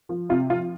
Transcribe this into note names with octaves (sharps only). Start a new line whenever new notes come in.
F3
C3 F4
F3 F4